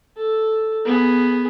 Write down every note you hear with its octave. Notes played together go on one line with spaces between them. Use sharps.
A4
B3 G#4